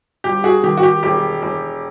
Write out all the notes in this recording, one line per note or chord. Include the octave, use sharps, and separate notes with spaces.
G1 G4
F#4 G#4
D#3 G4
F#4
G4
E1 G4
E1